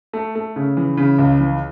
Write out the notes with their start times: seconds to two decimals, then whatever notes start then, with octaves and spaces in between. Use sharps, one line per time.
0.13 A3
0.35 A3
0.56 C#3
0.77 E3
0.97 C#3
1.18 C#2
1.40 E3